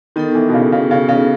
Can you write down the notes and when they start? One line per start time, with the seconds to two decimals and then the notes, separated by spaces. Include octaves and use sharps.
0.16 D#3 B3 D#4 A4
0.35 E3
0.49 B2
0.54 C#3
0.72 C#3
0.91 C#3
1.09 C#3